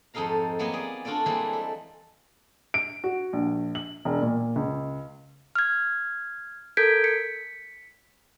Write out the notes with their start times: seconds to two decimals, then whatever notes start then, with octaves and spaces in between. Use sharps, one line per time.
0.14 F2 G#2 D#4 A4 F5 A#5
0.59 E3 F#3 A#3 B3
0.74 G#4 D5
1.05 D4 F4 F#4 A4 D5
1.26 E3 G3 G#3 A#3 C4 D5
1.53 A4
2.74 D7
3.04 F#4
3.33 A#1
3.75 F#7
4.05 E1
4.22 A#2
4.56 C#2
5.55 F6 G#6
6.77 A4 A#4 G6 G#6 B6 D7
7.04 B6 C#7